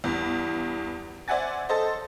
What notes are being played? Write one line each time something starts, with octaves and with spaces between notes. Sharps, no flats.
E2 G2
C5 D5 E5 F#5 G#5 A6
A4 C5 D#5